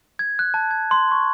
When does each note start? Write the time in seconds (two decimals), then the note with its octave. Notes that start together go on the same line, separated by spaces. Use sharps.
0.19 G#6
0.39 F#6
0.54 A5
0.71 G#6
0.91 C6
1.12 C#6